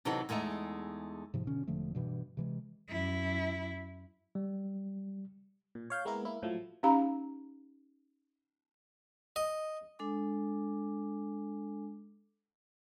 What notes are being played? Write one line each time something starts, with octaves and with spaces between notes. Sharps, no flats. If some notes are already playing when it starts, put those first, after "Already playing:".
C3 E3 F#3 D#4 F#4 A4
E2 G#3 A3 D#4 E5
G#2 C3 F3
B2 D3 C#4
E1 D3 F3 A3
G2 B2 E3
C3 E3 G#3
F#2 E4
G3
A#2
C#5 F5 G6
G#3 A#3 B3 E4 A#4
A#3 E4
A2 F3 F#3 A3
C#4 D#4 G4 F5 A#5 B5
D#5
G#3 D4 A4 G#5 D6